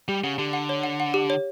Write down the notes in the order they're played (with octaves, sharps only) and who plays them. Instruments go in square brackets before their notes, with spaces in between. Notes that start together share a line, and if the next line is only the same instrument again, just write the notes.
[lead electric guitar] G3 [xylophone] G4
[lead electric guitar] C#3 [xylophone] F#5
[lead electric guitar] D3 [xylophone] G4
[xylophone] F#5
C#5
F#5
F#5
G4
C#5